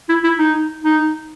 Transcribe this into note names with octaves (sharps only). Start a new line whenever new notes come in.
E4
E4
D#4
D#4